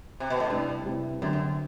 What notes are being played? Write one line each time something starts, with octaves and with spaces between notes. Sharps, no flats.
C3
B2
A2
G2 C3 G3 C4 E4
C3 G3 C4 E4
F#2 D3 F#3 C4
F#2